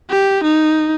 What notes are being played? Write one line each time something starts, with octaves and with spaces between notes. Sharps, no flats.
G4
D#4